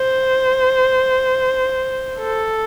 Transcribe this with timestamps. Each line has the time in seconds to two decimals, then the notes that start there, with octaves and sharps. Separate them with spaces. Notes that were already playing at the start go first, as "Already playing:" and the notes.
Already playing: C5
2.19 A4